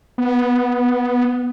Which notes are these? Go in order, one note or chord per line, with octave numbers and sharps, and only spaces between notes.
B3